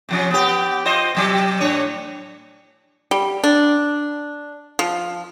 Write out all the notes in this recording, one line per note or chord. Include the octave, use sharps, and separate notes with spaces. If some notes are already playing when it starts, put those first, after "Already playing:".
C3 F3 C#4
B3 G4
F4 C5 D#5
C3 F#3 G4
A2 D4 C#5
G3
D4
F3